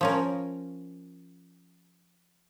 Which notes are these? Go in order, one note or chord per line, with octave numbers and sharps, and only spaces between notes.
F3 C#4 A#4